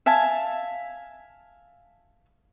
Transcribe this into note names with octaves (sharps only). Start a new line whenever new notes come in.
E5 F5 G#5 A5